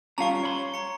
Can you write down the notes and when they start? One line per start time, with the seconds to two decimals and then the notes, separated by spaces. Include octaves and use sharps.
0.18 G3 C#4 F4 F5 A5 A#5 C#6
0.43 C#5 B5 C6
0.74 A#5 C#7